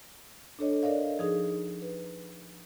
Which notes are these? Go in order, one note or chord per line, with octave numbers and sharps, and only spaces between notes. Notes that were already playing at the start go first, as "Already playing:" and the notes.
D4 A4 C#5 D#5
A#4 D5 D#5 F5
F3 D#4 G#4
B4